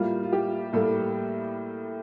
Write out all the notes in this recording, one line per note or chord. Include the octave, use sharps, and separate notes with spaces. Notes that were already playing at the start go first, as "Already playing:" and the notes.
Already playing: A2 G3 A#3 F4
F4
G4
A2 G3 A#3 A4